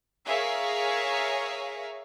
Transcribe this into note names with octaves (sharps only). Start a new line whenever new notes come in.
G#4 A#4 C#5 E5 F5 C#6